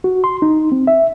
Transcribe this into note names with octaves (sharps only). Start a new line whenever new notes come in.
F#4
C6
D#4
C4
E5